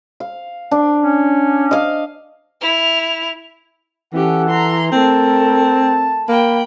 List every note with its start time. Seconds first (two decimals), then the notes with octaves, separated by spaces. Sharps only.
0.20 F5
0.71 D4
1.02 C#4
1.71 D#5 F5
2.61 E4 F7
4.14 E3 C#4 G4 A4 F#5
4.50 A#5 C6
4.92 A3 C4 A#4 A5
6.29 A#3 G5 B5